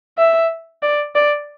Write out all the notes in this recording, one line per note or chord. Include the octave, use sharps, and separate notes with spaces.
E5
D5
D5